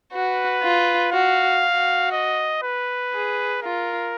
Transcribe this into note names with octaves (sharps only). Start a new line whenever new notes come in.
F#4 B4
F4
F#4 F5
F#4
D#5
B4
G#4
F4 A#4